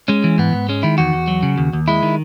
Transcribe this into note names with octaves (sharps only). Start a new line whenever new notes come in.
G#3 C#4
E3
G#2 B3
G#2
G#3 C#4
D#3 E4
E2 F#4
E2
F#3
C#3
D#2
D#2
G#3 E4
D#3